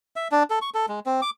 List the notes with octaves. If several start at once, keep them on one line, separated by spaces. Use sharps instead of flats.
E5
D4
A4
C#6
A4
G#3
C4
D6